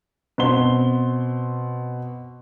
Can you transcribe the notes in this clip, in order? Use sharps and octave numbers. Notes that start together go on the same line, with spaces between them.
B2 C4 C6 G7